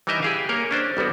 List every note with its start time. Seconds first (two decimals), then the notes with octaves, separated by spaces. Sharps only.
0.07 E3 G3 D#4 A#4 D#5 E5
0.23 G4 G#4 F5
0.49 A#3 A#4 C#5
0.71 C#4 D4 C5
0.97 A1 G3 B3 F#4